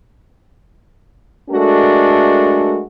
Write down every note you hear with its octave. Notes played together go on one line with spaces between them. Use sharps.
G#3 A3 D4 F#4 A4 A#4